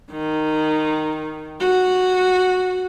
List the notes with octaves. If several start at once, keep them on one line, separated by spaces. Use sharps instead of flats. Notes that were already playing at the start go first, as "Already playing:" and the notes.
D#3
F#4